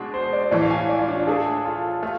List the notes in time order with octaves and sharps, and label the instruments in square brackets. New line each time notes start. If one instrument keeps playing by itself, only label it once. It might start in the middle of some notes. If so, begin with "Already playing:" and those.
Already playing: [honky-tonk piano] B2 G#3 D4
[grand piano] C5
D5
[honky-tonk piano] A2 E3 A3 [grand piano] D5
[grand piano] F5
G#5
D5
F4
D4
F4
[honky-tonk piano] A3 D4 A4 [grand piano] G#4
[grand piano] F4
[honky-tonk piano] A3 [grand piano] F4